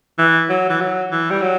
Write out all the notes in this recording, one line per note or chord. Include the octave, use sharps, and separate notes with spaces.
E3
F#3
E3
F#3
E3
G3
F#3